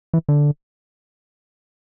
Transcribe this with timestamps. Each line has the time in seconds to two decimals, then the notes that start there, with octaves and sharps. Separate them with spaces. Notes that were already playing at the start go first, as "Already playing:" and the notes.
0.14 E3
0.29 D3